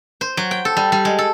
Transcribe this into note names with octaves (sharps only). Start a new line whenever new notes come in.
C5
F#3
G5
A4
G3
G3
G#3
A4